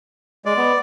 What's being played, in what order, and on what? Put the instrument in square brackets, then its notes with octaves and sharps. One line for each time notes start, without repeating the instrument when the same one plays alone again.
[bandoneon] G#3 [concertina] D5
[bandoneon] B3